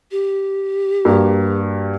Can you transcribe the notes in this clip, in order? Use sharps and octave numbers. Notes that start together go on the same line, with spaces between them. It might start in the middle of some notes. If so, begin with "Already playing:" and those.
G4
G2 A#3 F#4